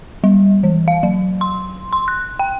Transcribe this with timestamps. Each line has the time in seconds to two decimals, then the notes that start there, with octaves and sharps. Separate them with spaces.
0.24 G3
0.63 E3
0.88 F5
1.03 F#3
1.41 C6
1.93 C6
2.08 F#6
2.39 G5